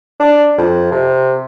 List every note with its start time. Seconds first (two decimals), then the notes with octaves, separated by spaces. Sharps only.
0.20 D4
0.58 F2
0.92 C3